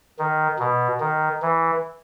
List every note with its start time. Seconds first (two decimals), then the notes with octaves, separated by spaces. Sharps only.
0.19 D#3
0.59 B2
1.00 D#3
1.42 E3